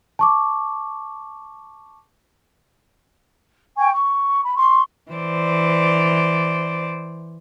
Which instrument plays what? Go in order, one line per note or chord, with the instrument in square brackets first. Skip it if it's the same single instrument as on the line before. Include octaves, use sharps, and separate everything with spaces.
[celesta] A5 C#6 D6
[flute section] G5 G#5 C#6
C#6
B5
C6 C#6
[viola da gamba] E3 C5 D5